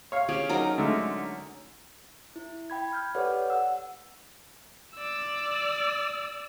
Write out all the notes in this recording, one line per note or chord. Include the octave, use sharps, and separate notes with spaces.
C#5 F5
C#4 G4 G#4
F#3 D#4 A#4
D3 G#3 A3
E4
G5 B5 G#6
B5 F6 G6
G4 A4 B4 C#5 D5 F#5
F#5 E6
D5 E6